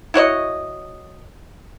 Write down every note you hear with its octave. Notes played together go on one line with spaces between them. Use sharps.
E4 F#4 C#5 D#5